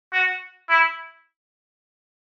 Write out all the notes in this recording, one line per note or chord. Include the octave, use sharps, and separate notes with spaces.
F#4
E4